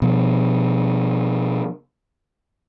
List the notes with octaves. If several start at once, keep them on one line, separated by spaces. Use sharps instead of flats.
B2 F3